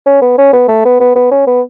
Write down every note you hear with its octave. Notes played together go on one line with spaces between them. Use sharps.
C#4
B3
C#4
B3
A3
B3
B3
B3
C#4
B3